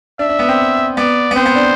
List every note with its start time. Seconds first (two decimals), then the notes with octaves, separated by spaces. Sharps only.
0.19 D4 E5
0.29 D4
0.39 B3
0.49 C4
0.97 B3 D5
1.31 B3
1.36 C4 C5
1.46 B3
1.55 D4